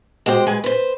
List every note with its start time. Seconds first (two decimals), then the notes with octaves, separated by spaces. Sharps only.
0.26 G#3 F#4 G4 C5
0.47 G#3 B4 G#5
0.64 B4 C5